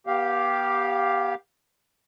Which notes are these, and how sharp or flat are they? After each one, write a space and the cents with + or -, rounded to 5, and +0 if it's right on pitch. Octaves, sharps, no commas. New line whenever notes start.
B3 -35 G4 +0 F5 +0